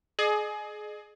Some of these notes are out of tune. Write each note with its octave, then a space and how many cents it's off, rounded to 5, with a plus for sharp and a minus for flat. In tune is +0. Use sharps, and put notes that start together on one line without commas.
G#4 +25 D#5 -45